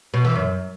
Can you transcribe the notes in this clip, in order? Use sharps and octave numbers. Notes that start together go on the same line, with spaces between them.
B2
E3
F#2